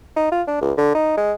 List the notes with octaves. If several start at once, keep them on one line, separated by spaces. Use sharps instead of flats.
D#4
F4
D4
C#2
D3
D#4
G#3